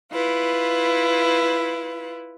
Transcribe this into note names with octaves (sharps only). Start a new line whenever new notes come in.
E4 F4 B4